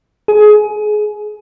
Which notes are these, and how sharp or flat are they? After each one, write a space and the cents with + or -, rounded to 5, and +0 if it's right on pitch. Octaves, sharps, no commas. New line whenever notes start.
G#4 +25